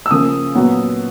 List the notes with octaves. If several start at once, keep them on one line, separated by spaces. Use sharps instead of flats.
E6
C#3 F3 A#3 D#6
A#2 F#3 B3